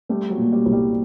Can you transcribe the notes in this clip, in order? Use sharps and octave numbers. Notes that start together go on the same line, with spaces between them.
G3 A3
F#3
A#2
G3
C2
G3